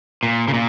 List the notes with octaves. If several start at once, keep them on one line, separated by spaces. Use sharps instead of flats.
A#2
C#3
A#2